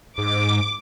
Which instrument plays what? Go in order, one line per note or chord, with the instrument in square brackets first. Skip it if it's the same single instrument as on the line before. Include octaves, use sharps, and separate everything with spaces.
[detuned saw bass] G#2 [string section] D6